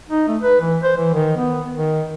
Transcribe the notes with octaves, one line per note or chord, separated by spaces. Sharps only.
D#4
A3
B4
E3
C5
E3
D#3
B3
D#3